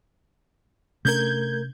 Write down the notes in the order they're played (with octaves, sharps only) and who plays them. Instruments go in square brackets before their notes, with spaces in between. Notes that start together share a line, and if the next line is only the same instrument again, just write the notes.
[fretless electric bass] C3 C#4 D4 [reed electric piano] A3 A#4 [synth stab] G6 G#6